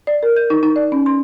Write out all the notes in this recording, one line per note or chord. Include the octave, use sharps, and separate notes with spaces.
D5
A#4
G6
D#4
D#4
D5
C#4
C6